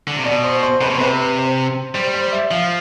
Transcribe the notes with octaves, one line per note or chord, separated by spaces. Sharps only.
D3
C3
B2 D5
C5
C5
C3 B4
B2
C5
C3 B4
C5
G3 C5
C5
E5
F3 F5